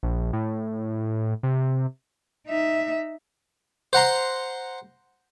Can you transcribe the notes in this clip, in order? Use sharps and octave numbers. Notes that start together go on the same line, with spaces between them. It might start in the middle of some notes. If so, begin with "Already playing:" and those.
A#1
A2
C3
D#4 E5
C5 F#5 A#5 C6